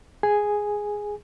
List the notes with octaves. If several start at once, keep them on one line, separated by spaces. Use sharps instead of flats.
G#4 G#5